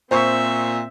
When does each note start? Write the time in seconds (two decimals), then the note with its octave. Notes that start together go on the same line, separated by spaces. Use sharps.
0.11 A#2 C4 C5 E5 C#6